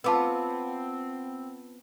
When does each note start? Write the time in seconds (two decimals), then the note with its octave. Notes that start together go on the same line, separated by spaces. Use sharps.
0.04 B3 C4 F4 A5 D6 E6